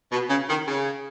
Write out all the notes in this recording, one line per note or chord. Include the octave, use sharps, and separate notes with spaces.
B2
C#3
D#3
C#3